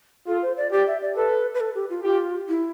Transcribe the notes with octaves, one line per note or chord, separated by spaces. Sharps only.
F4 A4
C5
D5
G4 D5
E5
D5
A4 B4
B4
A4
G4
F4
F4 G4
E4